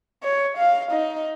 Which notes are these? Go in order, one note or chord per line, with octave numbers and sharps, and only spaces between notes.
C#5
F5
D#4